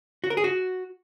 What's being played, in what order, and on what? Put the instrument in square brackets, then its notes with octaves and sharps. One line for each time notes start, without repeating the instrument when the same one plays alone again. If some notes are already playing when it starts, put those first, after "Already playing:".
[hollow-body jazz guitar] F#4
A#4
G#4
F#4